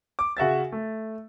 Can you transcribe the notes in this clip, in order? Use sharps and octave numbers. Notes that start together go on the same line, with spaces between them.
D6
C#3 F#4 E5 A6
A3